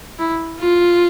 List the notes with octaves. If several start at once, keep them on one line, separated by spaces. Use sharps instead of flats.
E4
F4